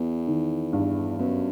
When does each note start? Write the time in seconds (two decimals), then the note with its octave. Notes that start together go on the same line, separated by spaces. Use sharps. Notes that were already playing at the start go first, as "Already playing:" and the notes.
Already playing: E2 B3
0.28 D#3
0.73 G2
1.19 F#2 B3